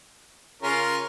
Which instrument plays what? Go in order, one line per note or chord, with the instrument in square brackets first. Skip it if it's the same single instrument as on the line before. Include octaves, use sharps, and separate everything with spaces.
[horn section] C#3 C#4 [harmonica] F4 A#4